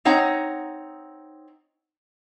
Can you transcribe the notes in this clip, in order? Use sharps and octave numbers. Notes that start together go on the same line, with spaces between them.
C4 D#4 C#5 F#5 A#5